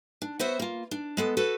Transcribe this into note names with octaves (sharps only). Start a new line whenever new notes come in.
D4
B3 F#4 C5 C#5 E5 F#5
A#3 F4
D4
G#3 B3 A4
F#4 A4 B4